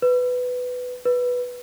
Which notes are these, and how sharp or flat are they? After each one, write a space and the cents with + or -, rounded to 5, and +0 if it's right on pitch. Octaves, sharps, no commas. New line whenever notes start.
B4 +10
B4 -5